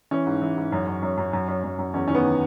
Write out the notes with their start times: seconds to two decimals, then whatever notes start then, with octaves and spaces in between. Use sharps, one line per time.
0.11 E3 C#4
0.26 G#2
0.42 E3
0.57 G#2
0.72 F#2
0.87 F#2
1.03 F#2
1.17 F#2
1.33 F#2
1.48 F#2
1.64 F#2
1.79 F#2
1.94 E2 C#4
2.08 D#3 C#4
2.15 B3
2.24 D#3